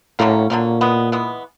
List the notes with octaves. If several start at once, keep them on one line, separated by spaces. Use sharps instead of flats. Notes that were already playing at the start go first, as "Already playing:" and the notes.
A2 D3 F#3 A#3 C#4
A#2 D3 F#3 A#3 C#4
E3 G#3 B3
E3 G#3 B3